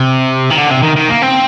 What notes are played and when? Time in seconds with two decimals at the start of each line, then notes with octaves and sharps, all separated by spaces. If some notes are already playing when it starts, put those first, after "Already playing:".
Already playing: C3
0.51 D#3
0.58 D3
0.71 C3
0.83 D#3
0.96 D#3
1.09 A#3
1.22 C4